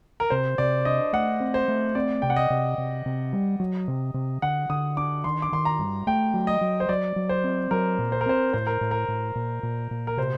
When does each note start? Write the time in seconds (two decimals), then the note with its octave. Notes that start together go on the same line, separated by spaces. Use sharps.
0.20 A#4
0.30 C3 C5
0.58 C3 D5
0.85 D4 D#5
1.13 A3 F#5
1.40 C4
1.54 C5
1.68 A3
1.95 C4 D5
2.22 C3 G5
2.30 F#5
2.36 D#5
2.50 C3
2.78 C3
3.06 C3
3.33 G3
3.60 F#3
3.88 C3
4.14 C3
4.42 D3 F#5
4.69 D3 D#6
4.97 D4 D6
5.24 D#3 C6
5.42 D6
5.52 D#3 C6
5.65 A#5
5.79 G2
6.07 A3 G5
6.34 F#3
6.47 D#5
6.61 F#3
6.80 C5
6.89 F#3 D5
7.16 F#3
7.29 C5
7.44 C4
7.71 F#3 A#4
7.99 A#2
8.12 C5
8.21 A#4
8.26 C4 C5
8.53 A2 C5
8.67 A#4
8.81 A2
8.91 A#4
9.08 A2
9.35 A#2
9.63 A#2
9.91 A#2
10.07 A#4
10.17 C3 C5